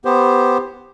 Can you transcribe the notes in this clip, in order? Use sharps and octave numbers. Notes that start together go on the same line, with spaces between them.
B3 G4 C5